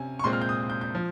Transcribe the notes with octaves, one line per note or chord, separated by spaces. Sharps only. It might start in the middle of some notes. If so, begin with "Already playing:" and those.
Already playing: C3 C#4 G#5
C#6
A#2 G#3 C4 C6
F6
G6
D#6
G6
G6
F3